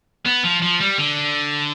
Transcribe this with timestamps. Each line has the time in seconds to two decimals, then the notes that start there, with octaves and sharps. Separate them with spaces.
0.26 B3
0.44 F3
0.62 F3
0.80 G3
0.98 D3